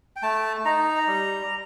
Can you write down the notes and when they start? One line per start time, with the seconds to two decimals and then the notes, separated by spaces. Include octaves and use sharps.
0.16 G5
0.22 A3 A5
0.65 D#4 A#5
1.08 G3